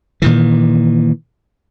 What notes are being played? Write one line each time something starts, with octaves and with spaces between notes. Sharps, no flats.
A#2 D#3 E3